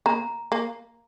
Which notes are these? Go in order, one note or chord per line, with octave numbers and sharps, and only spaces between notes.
A#3 A#5
A#3